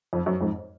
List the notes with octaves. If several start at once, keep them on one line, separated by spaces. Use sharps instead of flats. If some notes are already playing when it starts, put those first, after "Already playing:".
F2
F#2
F2 G#2